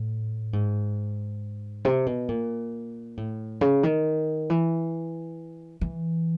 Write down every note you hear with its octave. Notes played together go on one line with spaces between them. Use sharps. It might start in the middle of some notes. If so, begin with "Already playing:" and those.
Already playing: A2
G#2
C3
B2
A#2
A2
C#3
D#3
E3
E3